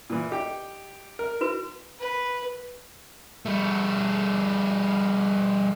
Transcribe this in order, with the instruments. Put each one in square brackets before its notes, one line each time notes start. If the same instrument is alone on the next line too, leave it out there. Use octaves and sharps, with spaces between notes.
[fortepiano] A#2 E3
D#4 G4 G5
A#4
[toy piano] E4 F#4 B4
[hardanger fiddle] B4
[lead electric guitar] G3 A3